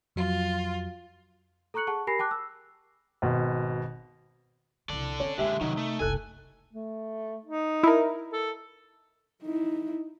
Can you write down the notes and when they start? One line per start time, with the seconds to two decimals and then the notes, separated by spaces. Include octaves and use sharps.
0.16 F2 F#3 F4
1.74 A4 A#5 C#6 F#6 C#7 F#7
1.87 G#4 F#5 A5 C#6
2.07 G4 A#4 G#5 B5 A#6 C7
2.19 G5 A5 D6 F#6
2.31 E6
3.22 G#1 B2
4.89 C2 F3 A4 D5
5.20 A3 C4 C#4
5.38 F#2 A#2 D3 G#3 G4 E5
5.61 C3 D#3 F#3 D#4
5.77 A3 A4
6.00 F#1 C2 A4 G#5 F#6
6.73 A3
7.45 D#4
7.83 E4 A#4
8.33 A4
9.43 D#4 E4